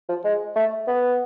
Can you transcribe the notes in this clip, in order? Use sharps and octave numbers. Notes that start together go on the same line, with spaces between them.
F3
G#3
A3
B3